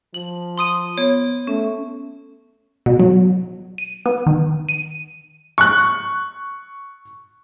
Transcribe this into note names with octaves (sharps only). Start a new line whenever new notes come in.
F3 F#7
C6 D#6 D#7
B3 C#5
A3 C#4
B2
F#3
D#7
B3
D#3
D#7
C#6 F#6